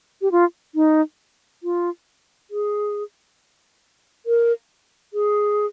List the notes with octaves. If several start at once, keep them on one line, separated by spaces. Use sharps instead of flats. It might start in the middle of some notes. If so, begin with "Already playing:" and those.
G4
F4
D#4
F4
G#4
A#4
G#4